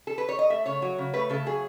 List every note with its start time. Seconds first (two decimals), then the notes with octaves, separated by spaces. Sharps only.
0.07 A4
0.18 B4
0.29 C#5
0.39 D#5
0.50 A3 E5
0.66 C#3 C#5
0.82 F#3
0.98 C#3
1.14 A3 B4
1.30 C#3 A4
1.46 F#3 G#4